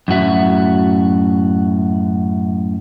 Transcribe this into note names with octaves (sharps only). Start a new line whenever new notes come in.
F#2 A2 F#4 E5